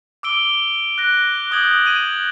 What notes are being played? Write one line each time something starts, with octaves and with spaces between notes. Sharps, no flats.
D6 E6 D7 G7
F#6 A#6
D6 D#6 G6 G#6 F#7
G#6 D#7 F#7